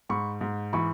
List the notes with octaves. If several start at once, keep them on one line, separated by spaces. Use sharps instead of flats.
G#2 B5 C#6
G#2
E3 B5 C#6